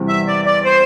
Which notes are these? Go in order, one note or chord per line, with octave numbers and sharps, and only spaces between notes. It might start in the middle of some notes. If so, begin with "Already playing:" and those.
Already playing: E2 C3 G3 C4 E4
E5
D5
D5
C5